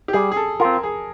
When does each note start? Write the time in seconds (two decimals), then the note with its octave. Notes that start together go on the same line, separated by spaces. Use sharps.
0.08 G4
0.13 G3 G#4
0.32 G#4
0.37 A4
0.60 F4 A#4
0.65 C4
0.83 G#4